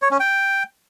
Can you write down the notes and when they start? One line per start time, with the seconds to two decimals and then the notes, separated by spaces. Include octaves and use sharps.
0.02 C#5
0.11 C#4
0.20 G5